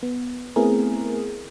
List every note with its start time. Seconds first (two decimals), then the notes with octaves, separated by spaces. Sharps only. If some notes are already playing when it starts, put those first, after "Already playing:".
0.03 B3
0.56 A3 B3 C4 E4 G#4 A#4